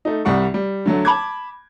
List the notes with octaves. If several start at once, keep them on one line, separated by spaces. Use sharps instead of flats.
A3 D#4
C2 G3 F#5 C#6
G3
D3 F#3 A3
A5 B5 D6 G#6